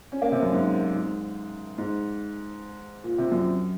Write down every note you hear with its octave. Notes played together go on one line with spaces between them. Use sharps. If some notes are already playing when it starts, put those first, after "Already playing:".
C#4
A#3
C3
F#2
G#2
G#2
G#2
A#2
C3
F#2